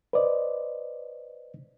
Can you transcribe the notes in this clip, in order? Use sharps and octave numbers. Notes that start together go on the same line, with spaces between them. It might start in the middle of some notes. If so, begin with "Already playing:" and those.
B4 C5 D5 D#5